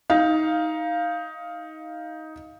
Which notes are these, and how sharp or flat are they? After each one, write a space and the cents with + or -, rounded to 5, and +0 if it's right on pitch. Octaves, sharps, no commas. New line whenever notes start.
D#4 +15 F5 +0